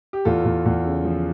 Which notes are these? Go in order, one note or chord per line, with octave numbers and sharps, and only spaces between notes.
G4
E2 F4 A4
E2
E2
C#3
F3